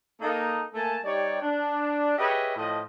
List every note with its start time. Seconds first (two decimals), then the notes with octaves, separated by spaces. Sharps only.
0.21 A#3 D#4 A4
0.74 A3 A#3 G#5 A5
1.03 G3 D#4 G4 C#5 D5
1.42 D4
2.18 G4 G#4 B4 C#5 D#5 E5
2.56 A2 F3 D#5